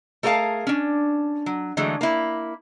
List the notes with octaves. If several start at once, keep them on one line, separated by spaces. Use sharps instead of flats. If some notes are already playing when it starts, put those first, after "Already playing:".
A3 G#4 A#4 C5 F5 A5
C#4 D4
F#3
D3 E3 F#3 G#3 A3
A#3 E4